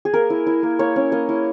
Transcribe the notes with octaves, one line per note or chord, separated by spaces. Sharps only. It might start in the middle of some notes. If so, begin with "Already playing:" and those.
G#4
A#3 A#4
E4
E4
A#3
A#3 C#5
C#4
A#3 D#5
E4